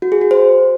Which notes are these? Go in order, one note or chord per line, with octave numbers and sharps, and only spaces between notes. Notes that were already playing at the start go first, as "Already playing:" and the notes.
F#4
G#4
F#4
C5